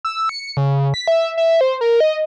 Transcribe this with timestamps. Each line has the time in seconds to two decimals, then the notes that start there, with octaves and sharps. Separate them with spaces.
0.05 E6
0.29 C#7
0.57 C#3
0.94 B6
1.08 E5
1.37 E5
1.61 C5
1.81 A#4
2.00 D#5